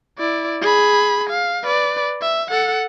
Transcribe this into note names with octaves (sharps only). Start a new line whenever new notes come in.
E4 D5
G#4 B5
F5
B4 D5
E5
A4 F#5